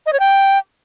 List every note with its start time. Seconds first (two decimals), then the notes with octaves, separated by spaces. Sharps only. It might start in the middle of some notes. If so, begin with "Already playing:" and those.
0.06 D#5
0.13 C#5
0.20 G5